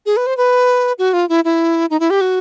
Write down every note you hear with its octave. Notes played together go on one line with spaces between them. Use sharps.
G#4
B4
C5
B4
F#4
F4
E4
E4
D#4
E4
G4
F#4